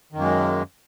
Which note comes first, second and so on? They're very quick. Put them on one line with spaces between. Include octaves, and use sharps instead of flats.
D#3 F#2 A#3 G#3